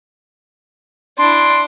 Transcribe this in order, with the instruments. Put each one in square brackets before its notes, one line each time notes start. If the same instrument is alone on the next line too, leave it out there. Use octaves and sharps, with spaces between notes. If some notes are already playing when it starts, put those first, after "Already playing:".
[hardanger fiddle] D4 E4 [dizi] C6